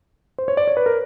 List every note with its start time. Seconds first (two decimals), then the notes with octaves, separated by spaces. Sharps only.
0.38 C5
0.48 C#5
0.57 D5
0.68 C#5
0.77 B4
0.86 A#4